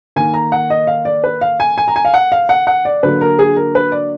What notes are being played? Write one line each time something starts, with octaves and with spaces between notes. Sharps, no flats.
D#3 A#3 G#5
A#5
F#5
D#5
F5
D5
B4
F5
G#5
G#5
A#5
G#5
F5
F#5
F5
F#5
F#5
D5
D3 F#3 A#3 B4
A#4
G#4
A#4
B4
D5